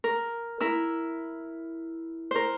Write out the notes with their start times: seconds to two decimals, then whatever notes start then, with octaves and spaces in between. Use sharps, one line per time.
0.04 A#4
0.60 E4 A#4 E6
2.31 A#4 C5